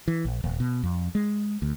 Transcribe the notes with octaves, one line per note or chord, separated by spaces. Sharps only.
E3
A#1
D#1
B2
F2
G#3
D2